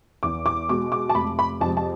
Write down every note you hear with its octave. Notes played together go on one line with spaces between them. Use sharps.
E2 D6
D6
B2 G#3 D6
D6
A5
F1 B5
B5
F2 C3 G#3 A5
A5